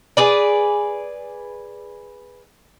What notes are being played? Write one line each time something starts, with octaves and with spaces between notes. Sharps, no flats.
G#4 B4 D5